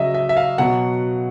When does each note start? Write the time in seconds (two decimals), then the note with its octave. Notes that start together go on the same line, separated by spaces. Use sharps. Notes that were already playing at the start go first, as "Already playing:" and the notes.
Already playing: C#3 F#3 D#5 E5
0.14 E5
0.29 E5
0.37 F5
0.58 B2 F#3 F#5